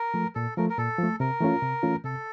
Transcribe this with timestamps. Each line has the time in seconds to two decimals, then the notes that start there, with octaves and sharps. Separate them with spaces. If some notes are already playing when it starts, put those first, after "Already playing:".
Already playing: A#4
0.14 F3 A3
0.35 A#2 A4
0.57 F3 A3 A#4
0.70 A#4
0.78 A#2 A4
0.98 F3 A3
1.20 C3 A#4
1.41 E3 A3 C#4 F4
1.62 C3
1.83 E3 A3 C#4 F4
2.04 C3 A4